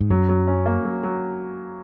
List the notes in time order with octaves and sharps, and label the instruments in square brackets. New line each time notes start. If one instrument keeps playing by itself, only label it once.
[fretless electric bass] G#2
[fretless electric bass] F#2 [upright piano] F#3
[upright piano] F#3
C#4
A#3
F#3
F#3